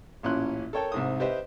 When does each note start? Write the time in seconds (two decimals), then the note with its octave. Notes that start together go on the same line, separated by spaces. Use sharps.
0.23 A1 A#2 C#4 E4 C6 F#6
0.73 A4 A#4 C#5 G5 A5
0.92 C2 G#2 D#6
1.20 G4 B4 C5 D#5 E5